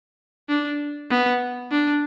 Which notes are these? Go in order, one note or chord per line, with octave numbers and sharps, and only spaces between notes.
D4
B3
D4